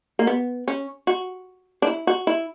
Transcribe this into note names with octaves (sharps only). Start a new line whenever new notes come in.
A#3
B3
C#4
F#4
D4
E4
F#4
E4